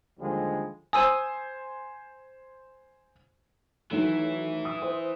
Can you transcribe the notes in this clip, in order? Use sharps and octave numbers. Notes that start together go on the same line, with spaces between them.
D#2 D3 F3 G3 G#3
C5 G#5 D#6 E6 D#7
D#3 E3 F#3 A3 E4
D#6
C5